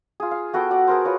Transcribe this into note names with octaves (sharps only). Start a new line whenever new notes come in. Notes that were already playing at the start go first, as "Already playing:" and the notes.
F4 G#4
F5
B3 F#4 A4 G5
F#4 D5
G#4 A#4 C5
F4 B4 C#5